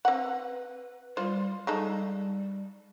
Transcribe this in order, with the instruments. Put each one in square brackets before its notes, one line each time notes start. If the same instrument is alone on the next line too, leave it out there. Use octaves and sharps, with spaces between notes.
[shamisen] C4 F#5 [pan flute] B4
[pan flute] G3 [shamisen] F4 C5
[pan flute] G3 [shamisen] G#3 D#4 A4